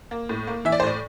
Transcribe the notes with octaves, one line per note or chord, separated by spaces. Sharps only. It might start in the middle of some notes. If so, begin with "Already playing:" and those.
A#3
A2
A#3
E3 E5
D5
C5
A2 D5